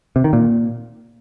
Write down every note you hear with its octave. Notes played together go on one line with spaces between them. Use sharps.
C3
D#3
A#2